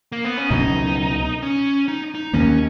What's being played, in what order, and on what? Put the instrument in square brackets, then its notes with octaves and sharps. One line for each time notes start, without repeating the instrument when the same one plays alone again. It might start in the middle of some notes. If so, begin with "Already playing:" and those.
[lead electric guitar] A#3
B3
C#4
[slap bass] C#2 B2 F#3 C#4 [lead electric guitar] D#4
[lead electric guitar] C#4
D#4
D#4
[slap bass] D#2 D#3 A#3 [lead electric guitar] C#4